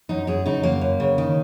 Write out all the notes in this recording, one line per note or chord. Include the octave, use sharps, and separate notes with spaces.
F#2 D#4
F#2 G#4
C#3 D#4
F#2 A#3
F#2
C#3
D#3